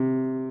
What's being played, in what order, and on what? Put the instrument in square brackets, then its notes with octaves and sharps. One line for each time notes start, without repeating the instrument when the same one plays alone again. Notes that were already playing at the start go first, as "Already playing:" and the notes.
Already playing: [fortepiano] C3